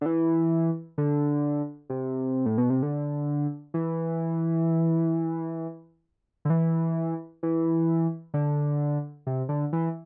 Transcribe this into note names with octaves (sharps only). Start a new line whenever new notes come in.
D3
E3
D3
C3
A2
B2
C3
D3
E3
D3
E3
E3
D3
C3
D3
E3